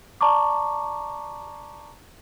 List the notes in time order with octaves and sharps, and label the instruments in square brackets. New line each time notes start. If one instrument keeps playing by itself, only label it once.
[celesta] D5 A5 A#5 C#6 D6